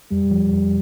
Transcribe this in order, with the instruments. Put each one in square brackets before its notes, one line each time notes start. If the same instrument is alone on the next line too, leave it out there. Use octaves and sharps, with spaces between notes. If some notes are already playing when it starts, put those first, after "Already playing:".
[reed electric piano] F2 [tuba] G3
[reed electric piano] F3
F2